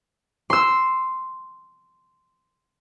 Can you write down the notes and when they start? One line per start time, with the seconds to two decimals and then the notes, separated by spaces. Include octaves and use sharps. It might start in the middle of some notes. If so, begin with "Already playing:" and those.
0.50 C6 E6